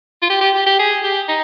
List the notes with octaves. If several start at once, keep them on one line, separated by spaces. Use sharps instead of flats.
F4
G4
G4
G4
G4
G#4
G4
D#4